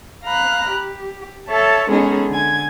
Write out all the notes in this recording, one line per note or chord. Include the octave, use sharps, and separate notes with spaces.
F5 A#5 B5 F6 F#6
G4
A4 C#5 E5 A5
G#3 B3 C#4 D#4 G#4 A4
D3 G#5 G#6